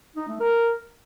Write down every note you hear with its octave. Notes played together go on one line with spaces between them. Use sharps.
D#4
A3
A#4